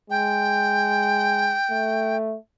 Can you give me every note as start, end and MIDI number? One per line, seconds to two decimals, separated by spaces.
0.10 1.56 56
0.10 2.17 79
1.71 2.36 57